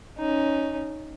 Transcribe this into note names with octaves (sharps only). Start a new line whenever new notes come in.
C#4 D#4